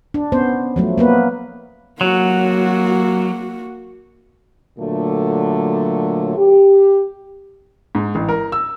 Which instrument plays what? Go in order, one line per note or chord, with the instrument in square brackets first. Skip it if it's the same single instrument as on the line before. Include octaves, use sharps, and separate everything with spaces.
[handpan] D4
B3 C#4 C5
F3 F#3 A3
A#3 B3 B4
[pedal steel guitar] F#3 [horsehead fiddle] A#3 F#4
[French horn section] A#2 D3 F#3 A3
G4
[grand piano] G#2
A1
A#4
E6